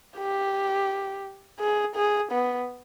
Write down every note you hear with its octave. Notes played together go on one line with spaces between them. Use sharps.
G4
G#4
G#4
B3